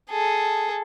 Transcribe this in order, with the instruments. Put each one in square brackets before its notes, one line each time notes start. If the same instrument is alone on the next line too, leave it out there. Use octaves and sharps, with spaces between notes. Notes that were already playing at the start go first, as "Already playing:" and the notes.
[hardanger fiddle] G#4 A4